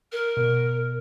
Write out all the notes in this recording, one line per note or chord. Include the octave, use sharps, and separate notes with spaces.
A#4
B2